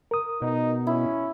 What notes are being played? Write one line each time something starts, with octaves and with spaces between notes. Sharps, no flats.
A#4 D#6
B2 D#4
C#4 E4